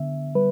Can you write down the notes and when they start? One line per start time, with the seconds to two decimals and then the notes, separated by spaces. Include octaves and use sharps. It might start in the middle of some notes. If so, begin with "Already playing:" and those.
Already playing: D3 B3 E5
0.35 G3 B4